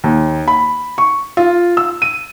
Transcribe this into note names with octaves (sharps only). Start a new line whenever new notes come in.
D#2
B5
C#6
F4
E6
D#7